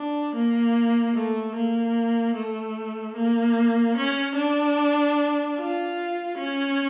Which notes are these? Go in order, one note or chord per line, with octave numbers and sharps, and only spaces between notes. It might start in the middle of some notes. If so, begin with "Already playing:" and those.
Already playing: D4
A#3
A3
A#3
A3
A#3
C#4
D4
F4
C#4